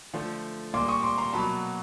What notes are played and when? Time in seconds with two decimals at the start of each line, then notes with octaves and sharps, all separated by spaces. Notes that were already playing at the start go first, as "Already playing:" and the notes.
0.13 D3 F3 A3
0.74 A#2 G3 A#3 C6 D6
0.88 C#6 D#6
1.03 C6 D6
1.18 A#5 C6
1.33 B2 F#3 A#3 A5 B5